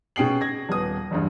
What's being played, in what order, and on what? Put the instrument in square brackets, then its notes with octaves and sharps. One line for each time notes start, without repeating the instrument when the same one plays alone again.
[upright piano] B2 C#4 G#4 G5 C7 F#7
G#6 A#6
D#1 B3 D#6
F#1 E2 G2